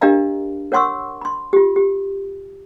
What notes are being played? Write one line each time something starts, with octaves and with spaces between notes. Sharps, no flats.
D4 G4 A#4 D#5 F5 A#5
A#4 C#5 F#5 C6 C#6 E6
B5 C6
F4 G4
G4